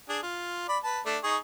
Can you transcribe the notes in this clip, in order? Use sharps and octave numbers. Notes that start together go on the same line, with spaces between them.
D4 G#4
F4
D5 B5
B4 A5
A3 D4
D#4 G#4 C#6